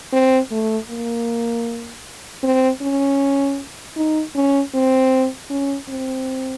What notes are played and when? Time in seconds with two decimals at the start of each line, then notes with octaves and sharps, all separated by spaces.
0.12 C4
0.51 A3
0.90 A#3
2.43 C4
2.81 C#4
3.96 D#4
4.35 C#4
4.74 C4
5.50 C#4
5.89 C4